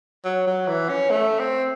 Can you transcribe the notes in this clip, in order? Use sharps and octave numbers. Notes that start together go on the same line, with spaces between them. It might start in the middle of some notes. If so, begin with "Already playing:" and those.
F#3
F#3
E3
C#4
A3
C4